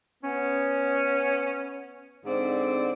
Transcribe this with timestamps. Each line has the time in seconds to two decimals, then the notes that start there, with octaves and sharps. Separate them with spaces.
0.23 B3 C#4
2.26 G#2 D3 C4 D5